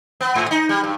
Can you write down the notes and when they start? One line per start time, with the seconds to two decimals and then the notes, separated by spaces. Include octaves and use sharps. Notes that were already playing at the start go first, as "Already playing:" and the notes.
0.21 B3
0.35 G#2
0.51 D#4
0.69 G3
0.84 G2